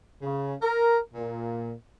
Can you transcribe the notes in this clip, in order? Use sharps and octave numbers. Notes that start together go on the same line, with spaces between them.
C#3
A#4
A#2